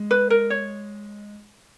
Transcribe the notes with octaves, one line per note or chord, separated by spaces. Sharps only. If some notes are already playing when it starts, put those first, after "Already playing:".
Already playing: G#3
B4
A#4
C#5